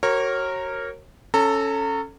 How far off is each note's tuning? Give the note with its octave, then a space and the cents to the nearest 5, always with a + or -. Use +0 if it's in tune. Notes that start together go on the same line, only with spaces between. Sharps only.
F#4 +35 A#4 -10 C#5 -25
C#4 +0 A4 +0 A#5 -30